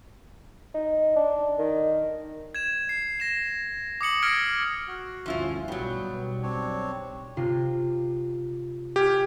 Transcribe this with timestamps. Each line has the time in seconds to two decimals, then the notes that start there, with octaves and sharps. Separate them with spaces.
0.75 D#4
1.16 D4
1.59 D#3
2.55 G#6 E7
2.89 C7
3.20 A#6 E7
4.01 D6 D#6 C#7 F#7
4.22 E6 F6 G#6 A#6 C7 D7
4.87 F#4
5.26 D2 G2 F3 C#4 E4 F4
5.68 B1 F#3 G3 B3 G4
6.43 C4 D4 C#5
7.37 C3 F4 C7
8.96 G4 G#5 F6 G#6